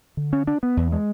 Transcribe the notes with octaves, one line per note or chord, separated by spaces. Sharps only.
D3
C#4
D4
B3
E2
G#3